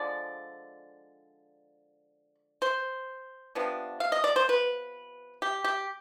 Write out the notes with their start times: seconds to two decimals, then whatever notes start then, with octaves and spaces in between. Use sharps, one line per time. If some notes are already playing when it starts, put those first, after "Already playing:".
Already playing: D3 F3 G#3 D5
2.62 C5
3.55 C3 F3 B3 D4
4.00 F5
4.12 D#5
4.24 D5
4.36 C5
4.49 B4
5.42 G4
5.64 G4